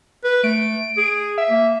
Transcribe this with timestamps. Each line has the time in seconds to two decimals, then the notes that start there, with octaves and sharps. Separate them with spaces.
0.24 B4
0.44 A3 D7
0.98 G#4
1.38 E5
1.50 A#3